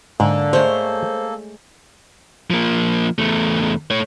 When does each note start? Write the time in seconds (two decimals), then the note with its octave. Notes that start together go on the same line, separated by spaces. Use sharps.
0.20 G#2 D3 A#3 A4
0.53 G#3 A3 C5 C#5
2.50 F3 A#3
3.19 E2 A3
3.91 A3 C#5